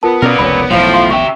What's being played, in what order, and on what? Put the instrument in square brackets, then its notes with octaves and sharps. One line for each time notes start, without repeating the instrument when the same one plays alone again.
[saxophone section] B3 [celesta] F4 A#4 A5
[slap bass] B2 C#4 [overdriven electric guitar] A#4 D5 [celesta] F6
[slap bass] F1 C#2 [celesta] C#5 B5
[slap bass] E1 B1 [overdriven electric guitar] A2 E4 [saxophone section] F3
[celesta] F5 C6
[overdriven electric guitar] C#3 E5 [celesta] G5 C#6